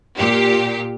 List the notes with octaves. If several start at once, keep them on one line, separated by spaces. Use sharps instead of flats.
A#2 G4